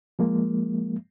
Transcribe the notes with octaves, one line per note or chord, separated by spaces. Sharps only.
F3 G#3 A#3